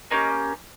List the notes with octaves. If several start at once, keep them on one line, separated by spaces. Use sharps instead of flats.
A#3 C#4 G4 D#5